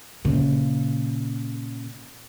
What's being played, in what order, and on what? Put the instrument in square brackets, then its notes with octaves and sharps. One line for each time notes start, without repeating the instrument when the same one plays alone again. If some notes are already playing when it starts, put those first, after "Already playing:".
[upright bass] A#2 C#3